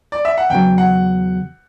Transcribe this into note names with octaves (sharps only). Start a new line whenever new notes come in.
D5
E5
F#5
E2 C#3 F#3 G5
F#5